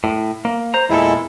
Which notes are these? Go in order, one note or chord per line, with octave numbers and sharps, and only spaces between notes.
A2
A#3
C5 A#5
E2 A#2 G#3 E4 A4